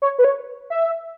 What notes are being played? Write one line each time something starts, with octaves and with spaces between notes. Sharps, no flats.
C#5
B4
C#5
E5